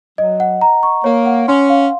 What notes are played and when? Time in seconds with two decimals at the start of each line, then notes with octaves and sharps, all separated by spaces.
0.18 F#3 D#5
0.40 F#5
0.61 A#5
0.83 C#6
1.04 A#3 C#5
1.26 F#5
1.47 C#4 C6
1.69 F5